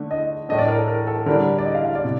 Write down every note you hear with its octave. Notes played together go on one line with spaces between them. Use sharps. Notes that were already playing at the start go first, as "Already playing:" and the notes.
Already playing: D3 A3 D4
D#5
A2 A3 D4 D#5
D5
A#4
A4
A#4
A4
D3 G3 D4 A#4
D5
D#5
F5
F5
D5
C3